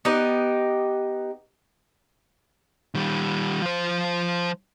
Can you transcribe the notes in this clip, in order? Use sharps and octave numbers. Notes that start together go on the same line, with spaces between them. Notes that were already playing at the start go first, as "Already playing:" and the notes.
B3 D#4 G4
D#3 G3
F3 C5